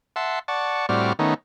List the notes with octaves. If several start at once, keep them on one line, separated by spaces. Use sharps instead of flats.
E5 F#5 A5 C6
D5 F#5 A5 C#6
A2 G3 C4 F#4 D5 F6
D#3 A3 B3 C#4 D#4